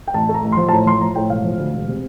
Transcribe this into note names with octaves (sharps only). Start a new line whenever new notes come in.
G5
A1 A5
A3
A#5
A1
F3 C6
A5
A2 A#5
F3 C6
F3 A#5
A2 G5
E1 F5
F3
D2
E1
C3